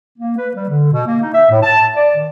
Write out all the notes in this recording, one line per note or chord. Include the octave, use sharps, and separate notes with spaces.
A#3
B4
G3
D3
B2
A#3
D#4
E5
A2
A5
D5
D#3